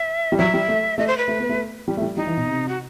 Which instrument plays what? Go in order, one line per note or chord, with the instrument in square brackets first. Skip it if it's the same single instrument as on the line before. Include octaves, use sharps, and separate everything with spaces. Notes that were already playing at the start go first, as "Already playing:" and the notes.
Already playing: [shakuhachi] E5
[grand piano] G3
[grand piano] F#3 [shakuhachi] E5
[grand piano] G3
A3
[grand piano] A3 [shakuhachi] D#5
[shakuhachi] C5
B4
[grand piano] A3
B3
A3
G3
A3
G3
[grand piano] G3 [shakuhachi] D#4
[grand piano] E3
B2
C3
[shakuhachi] F#4